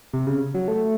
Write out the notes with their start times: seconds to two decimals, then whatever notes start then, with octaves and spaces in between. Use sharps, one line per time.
0.13 C3
0.27 C#3
0.54 F#3
0.68 A3